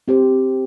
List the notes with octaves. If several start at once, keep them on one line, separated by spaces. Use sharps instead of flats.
C4 G4 C5